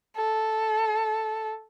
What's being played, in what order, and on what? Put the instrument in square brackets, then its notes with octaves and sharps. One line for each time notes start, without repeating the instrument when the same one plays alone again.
[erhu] A4